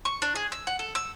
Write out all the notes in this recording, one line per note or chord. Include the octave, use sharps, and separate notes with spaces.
C#6
D4
G#4
E6
F#5
A4
E6